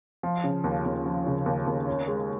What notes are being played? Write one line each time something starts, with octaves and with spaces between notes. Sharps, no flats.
F3
C#3
D#2
D#2
F3
C#3
D#2
D#2
C#4
G#3